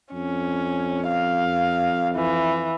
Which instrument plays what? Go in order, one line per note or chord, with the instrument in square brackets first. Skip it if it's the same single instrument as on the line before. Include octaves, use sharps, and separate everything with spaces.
[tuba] F2 [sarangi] C#4
[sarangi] F5
E3